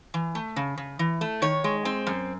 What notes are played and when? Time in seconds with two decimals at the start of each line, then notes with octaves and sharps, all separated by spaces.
0.14 E3
0.35 A3
0.56 C#3
0.78 C#3
0.99 E3
1.21 A3
1.42 D#3 C#5
1.64 G#3
1.85 C4
2.07 F#2